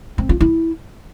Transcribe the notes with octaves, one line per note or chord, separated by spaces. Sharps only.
C4
F4
E4